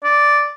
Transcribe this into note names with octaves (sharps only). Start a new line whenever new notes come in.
D5